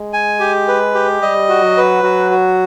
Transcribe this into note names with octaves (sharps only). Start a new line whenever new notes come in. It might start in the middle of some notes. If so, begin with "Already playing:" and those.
Already playing: G#3
G#5
G4
B4
G4
G3 D#5
F#4
F#3
B4
F#3 F#4
F#4